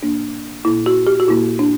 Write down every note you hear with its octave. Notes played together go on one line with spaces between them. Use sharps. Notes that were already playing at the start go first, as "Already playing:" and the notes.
A#2 A#3 D4
A#2 A#3 E4
F#4
G4
F#4
A#2 A#3 E4
D4